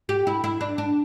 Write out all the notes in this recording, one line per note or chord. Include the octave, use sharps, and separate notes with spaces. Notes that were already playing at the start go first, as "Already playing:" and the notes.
G4
E4
E4
D4
D4